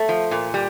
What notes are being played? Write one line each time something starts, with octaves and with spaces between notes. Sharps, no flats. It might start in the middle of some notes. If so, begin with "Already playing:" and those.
Already playing: A3
F3
A#2
G3